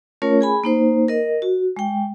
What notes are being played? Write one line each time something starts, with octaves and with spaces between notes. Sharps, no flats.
A3 C#4 F4 A#4 C#5
G#4 G#5 B5
A#3 D#4 C5
A#4 D#5
F#4
G#3 G5